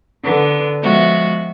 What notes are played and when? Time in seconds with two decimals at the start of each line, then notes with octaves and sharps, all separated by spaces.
0.23 D3 B3
0.84 F3 G#3 B3 F#4 E5